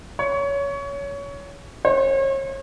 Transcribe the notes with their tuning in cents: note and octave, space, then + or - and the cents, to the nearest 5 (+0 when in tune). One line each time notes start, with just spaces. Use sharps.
C#5 +20
C#5 -40